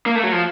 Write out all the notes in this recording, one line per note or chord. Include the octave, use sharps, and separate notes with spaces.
A#3
A3
F#3
F3